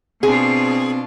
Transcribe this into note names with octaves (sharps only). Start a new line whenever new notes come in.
B2 C4 D4 F4 G#4